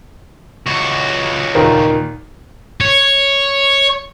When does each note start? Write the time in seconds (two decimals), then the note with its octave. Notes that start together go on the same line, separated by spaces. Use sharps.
0.66 C#2 F#4
1.55 D#2 A#2 D#3
2.81 C#5